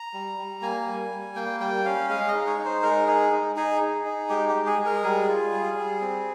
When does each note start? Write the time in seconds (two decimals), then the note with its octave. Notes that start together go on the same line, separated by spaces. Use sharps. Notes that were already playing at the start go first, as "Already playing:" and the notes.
Already playing: A#5
0.13 G3
0.38 G3
0.62 A#3 G#5
0.86 G3
1.11 G3
1.35 A#3 G5
1.60 G3 G5
1.85 C#4 F5
2.09 G#3 F5
2.28 D#5
2.35 D#4
2.46 C#5
2.59 D#4
2.65 C5
2.82 G#3 A#4
3.07 D#4 G#4
3.32 D#4
3.56 D#4 G#4
3.81 D#4
4.05 D#4
4.29 G#3 G4
4.49 G4
4.55 G#3
4.66 G#4
4.79 G#3
4.85 A#4
5.03 G3 G#4
5.28 F4
5.52 G3
5.78 G3
6.01 C4